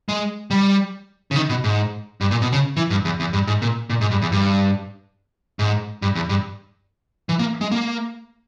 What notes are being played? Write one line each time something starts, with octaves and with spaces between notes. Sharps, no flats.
G#3
G3
C#3
D#3
B2
G#2
G2
A#2
B2
C#3
E3
G2
E2
E2
G2
G#2
A#2
A#2
G#2
G2
E2
G2
G#2
G2
E2
G2
E3
A#3
G#3
A#3